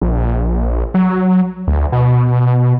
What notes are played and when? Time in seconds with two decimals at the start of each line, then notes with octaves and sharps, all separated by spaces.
0.01 A#1
0.94 F#3
1.67 D2
1.92 B2